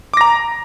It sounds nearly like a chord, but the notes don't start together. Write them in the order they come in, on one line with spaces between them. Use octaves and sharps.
D6 A#6 A#5